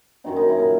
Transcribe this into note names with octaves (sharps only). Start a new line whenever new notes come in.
F#2 D#3 F#3 D#4
D#4
E4
A#2 A#4
F#3